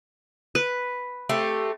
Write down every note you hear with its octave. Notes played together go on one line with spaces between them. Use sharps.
B4
A3 C4 G4